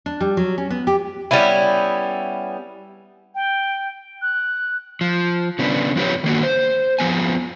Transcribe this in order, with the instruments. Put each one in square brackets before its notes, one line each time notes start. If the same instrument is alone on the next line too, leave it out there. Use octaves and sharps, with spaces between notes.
[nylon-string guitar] D4
G3
F#3
C#4
B3
G4
[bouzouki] G3 B3 C#4 E4
[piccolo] G5
F#6
[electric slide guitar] F3
C#3 B3 D4
F2 B3 F4 G4 B4 C#5
D#3 A#3 F#4
C5
F2 F3 B3 G#5